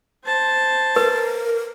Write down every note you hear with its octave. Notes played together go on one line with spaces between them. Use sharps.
C5 A5
A#4 B4